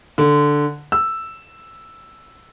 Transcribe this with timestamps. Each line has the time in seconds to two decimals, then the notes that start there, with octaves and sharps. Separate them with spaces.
0.18 D3
0.92 E6